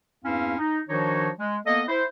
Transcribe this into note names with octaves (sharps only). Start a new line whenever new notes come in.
E2 G2 C4 C#4 E4 F5
D#4
D#3 F3 D4 D#4 F#4 C#5
G#3
A#3 B3 A4 D#5
E4 C5